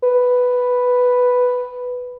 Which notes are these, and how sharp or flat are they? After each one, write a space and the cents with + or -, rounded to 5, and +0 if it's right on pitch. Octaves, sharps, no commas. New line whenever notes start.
B4 +5